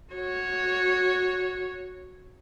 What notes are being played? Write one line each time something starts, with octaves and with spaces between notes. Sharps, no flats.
F#4 C#5